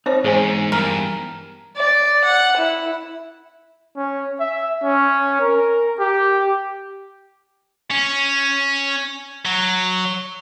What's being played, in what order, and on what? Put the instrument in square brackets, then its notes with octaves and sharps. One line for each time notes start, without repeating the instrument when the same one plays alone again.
[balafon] C4 C5 C#5 [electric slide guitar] D#4
[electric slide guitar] E2 E4 G#5 [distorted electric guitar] G#2 [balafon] G#4 C5
[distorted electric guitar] G2 [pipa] A#4
[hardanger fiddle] D5
F#5
E4
[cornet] C#4
E5
C#4
A#4
G4
[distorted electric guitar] C#4
F#3